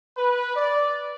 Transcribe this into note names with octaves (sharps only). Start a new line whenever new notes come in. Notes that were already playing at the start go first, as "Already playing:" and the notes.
B4
D5